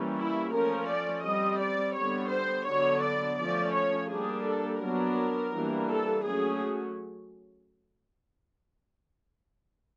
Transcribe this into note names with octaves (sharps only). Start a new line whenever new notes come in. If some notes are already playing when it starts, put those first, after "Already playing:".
Already playing: E3 G3 A#3 C#4
E4
F3 A3 C#4 A#4
D5
G3 C4 D#5
D5
D3 G3 B3 C#5
C5
D3 F#3 B3 D4 C#5
D5
F3 A3 C#4 D5
C#5
G3 A#3 D4 G#4
A4
F#3 B3 D4 A#4
E3 G3 A#3 D4
A4
F#3 A3 C#4 G#4